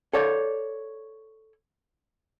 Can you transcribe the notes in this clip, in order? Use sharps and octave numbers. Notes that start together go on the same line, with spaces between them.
A4 C#5 D5